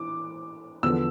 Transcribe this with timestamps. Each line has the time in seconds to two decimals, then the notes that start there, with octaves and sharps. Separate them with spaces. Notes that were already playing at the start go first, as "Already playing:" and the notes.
Already playing: E3 D6
0.83 E2 D3 F3 B3 E6